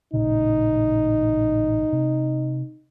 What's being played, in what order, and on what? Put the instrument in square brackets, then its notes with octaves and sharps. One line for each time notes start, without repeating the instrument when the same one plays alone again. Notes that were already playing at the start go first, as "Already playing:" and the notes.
[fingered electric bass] A1 A#2 C#3 [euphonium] D#4
[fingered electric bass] C3